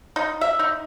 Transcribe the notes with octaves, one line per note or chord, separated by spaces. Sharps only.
D#4
E5
D#4